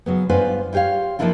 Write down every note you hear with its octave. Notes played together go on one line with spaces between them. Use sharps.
C#3 F#3 B3
G2 B3 F4 B4 C5 G#5
E4 F4 G4 C#5 F5
F3 G3 A#3 D4 E4 F4